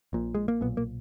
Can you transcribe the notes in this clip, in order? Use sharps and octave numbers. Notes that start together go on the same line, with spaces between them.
A#1 A#2
G#3
A#3
B1 A#2 B3
A#3